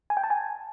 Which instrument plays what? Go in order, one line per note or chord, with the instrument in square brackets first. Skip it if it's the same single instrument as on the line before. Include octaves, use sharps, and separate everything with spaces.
[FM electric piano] G#5
G5
A5
G#5